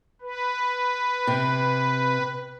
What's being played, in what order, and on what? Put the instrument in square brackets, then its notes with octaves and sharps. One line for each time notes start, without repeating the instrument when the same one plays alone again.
[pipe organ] B4
[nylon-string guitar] C3